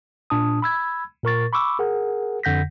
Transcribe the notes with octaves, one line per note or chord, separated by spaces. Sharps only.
A#2 D4 A5 D#6
B5 E6 G#6
A#2 A#4 C#6 A6
B5 C#6 D6 E6
G#4 A#4 F#5
F2 D3 F#5 G6 A#6 B6